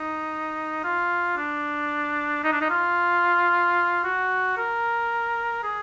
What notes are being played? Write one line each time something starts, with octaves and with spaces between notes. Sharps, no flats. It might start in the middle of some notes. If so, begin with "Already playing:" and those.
Already playing: D#4
F4
D4
D#4
D4
D#4
F4
F#4
A#4
G#4